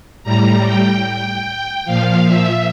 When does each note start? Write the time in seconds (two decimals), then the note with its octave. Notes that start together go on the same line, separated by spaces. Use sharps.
0.23 A2 G3 A#5
0.64 G5
1.04 G5
1.85 A#2 F3 F5
2.24 E5